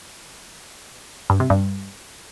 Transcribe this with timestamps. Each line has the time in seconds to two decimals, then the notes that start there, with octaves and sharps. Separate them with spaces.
1.30 G2
1.40 C3
1.50 G2